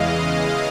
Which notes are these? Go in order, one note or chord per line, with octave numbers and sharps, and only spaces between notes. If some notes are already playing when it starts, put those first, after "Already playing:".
Already playing: E2 C#3 E3 G#3 D#5 F5